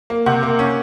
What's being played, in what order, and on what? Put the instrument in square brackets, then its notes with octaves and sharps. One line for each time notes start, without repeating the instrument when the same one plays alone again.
[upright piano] A#3
C3 F#5
A#3
C#4